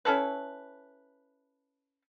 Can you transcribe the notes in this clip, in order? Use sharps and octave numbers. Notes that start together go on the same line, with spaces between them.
C#4 E4 A4 B4